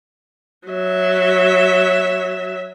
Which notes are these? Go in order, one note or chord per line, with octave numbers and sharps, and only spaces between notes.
F#3 E5